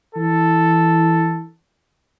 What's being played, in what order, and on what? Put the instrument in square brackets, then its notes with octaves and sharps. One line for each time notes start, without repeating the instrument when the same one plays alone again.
[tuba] E3 [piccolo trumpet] A4